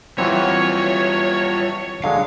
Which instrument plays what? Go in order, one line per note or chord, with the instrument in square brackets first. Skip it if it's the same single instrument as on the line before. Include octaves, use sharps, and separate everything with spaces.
[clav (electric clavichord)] E3 F#3 C4 [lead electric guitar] G3 F4 [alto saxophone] C#5
[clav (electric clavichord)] D3 F#3 G#3 [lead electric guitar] F5